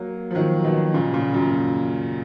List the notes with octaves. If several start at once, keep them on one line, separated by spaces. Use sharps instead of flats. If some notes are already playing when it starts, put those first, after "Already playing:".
Already playing: F#3 A#3
F3
D#3 F#3
B2 D#3
A#2 C#3
A#2 C#3
F#2 A#2